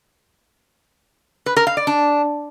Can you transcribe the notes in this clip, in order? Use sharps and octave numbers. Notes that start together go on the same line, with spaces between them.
B4
A#4
F5
D5
D4